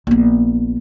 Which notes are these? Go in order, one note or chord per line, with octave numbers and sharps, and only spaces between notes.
A#1 B3